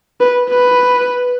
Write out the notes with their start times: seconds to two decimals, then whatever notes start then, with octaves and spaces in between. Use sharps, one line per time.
0.20 B4
0.49 B4